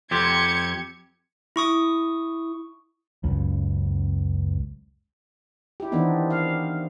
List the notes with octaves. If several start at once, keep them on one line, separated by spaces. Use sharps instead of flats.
F2 C4 G4 G#6 C#7
E4 C#6 D#6
F#1 C#2
E4 G4
D#3 E3 B3 C4 D4 D#4
F5